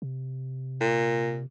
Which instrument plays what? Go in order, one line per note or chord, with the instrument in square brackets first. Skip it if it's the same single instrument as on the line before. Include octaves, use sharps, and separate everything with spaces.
[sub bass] C3
[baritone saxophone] A#2